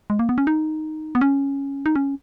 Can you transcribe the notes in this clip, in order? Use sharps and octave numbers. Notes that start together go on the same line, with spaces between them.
G#3
A#3
B3
C#4
D#4
B3
C#4
D#4
C#4